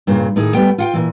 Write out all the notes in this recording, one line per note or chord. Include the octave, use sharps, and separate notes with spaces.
G2 A#2 C#3
A2 D#3 D#4 G#4
G3 A3 B3 G5
F4 F#5 G5
A#2 E3